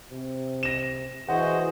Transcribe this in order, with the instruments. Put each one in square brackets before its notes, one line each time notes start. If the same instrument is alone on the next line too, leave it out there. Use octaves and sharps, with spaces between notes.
[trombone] C3
[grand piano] A#6 E7
[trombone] E3 [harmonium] F#4 G#4 [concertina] C5 D#5 [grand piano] F#5